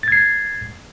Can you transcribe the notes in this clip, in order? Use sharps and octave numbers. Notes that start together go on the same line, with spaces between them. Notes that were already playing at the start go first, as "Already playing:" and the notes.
G#6 A6 C7